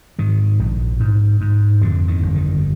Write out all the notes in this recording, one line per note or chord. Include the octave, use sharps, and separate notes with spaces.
G#2 D#3
A#1
G#2
G#2
F2 D3
D#3
G1
D#3